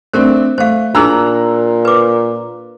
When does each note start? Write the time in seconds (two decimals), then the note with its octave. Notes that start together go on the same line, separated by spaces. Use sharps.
0.13 A3 C4 D4 A#4 C5
0.58 A3 C5 F5
0.95 A#2 D4 D#4 G#4 A#5 E6 F#6
1.85 B4 D6